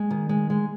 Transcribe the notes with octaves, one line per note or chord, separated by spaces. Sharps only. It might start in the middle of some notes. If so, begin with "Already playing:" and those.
Already playing: G#3
D#3
G#3
G#3